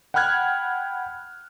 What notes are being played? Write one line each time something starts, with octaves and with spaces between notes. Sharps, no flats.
F#5 G5 B5 F6 F#6 G#6